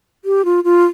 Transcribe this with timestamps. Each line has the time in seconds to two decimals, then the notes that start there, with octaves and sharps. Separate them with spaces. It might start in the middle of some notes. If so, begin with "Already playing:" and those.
0.25 G4
0.45 F4
0.64 F4